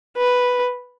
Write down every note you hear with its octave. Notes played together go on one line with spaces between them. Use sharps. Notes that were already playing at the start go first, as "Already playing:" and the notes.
B4